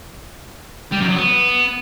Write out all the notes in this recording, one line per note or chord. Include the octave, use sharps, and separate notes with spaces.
G3
F#2
F#3
B3